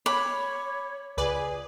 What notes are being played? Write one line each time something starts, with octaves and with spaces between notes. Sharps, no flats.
C#5 B5 D6
C#2 G#4 B4 D5